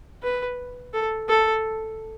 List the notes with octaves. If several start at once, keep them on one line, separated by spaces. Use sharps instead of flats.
B4
A4
A4